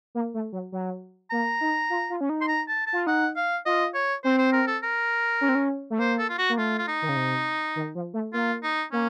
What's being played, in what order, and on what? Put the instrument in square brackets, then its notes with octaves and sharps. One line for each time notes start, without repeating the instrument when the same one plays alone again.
[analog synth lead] A#3
A3
F#3
F#3
[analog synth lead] A#3 [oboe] A#5
[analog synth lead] D#4
F4
F4
C#4
D#4
[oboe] C6
A#5
A5
A5
[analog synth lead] F4
[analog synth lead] D#4 [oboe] F#5
[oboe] F5
[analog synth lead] F4 [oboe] D#5
[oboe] C#5
[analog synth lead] C4 [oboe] C5
[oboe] C5
A#4
A4
A#4
[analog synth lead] C#4
C4
C#4
A3
[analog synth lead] A#3 [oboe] C5
[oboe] A4
F4
F#4
[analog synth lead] A#3
[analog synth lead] A3 [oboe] F4
[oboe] F4
D#4
[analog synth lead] D#3
C#3
C3
D#3
F3
A3
[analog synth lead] A#3 [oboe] F4
[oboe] D#4
[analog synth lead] A#3 [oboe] C#4